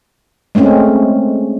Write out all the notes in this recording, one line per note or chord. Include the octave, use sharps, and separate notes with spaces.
G#3 A3 C4 C#4